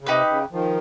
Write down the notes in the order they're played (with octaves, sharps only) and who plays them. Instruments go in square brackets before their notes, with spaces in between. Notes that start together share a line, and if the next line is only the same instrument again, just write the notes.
[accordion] C#3
[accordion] C3 [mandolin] D#4 G4 B4
[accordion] C#3
D#3 F3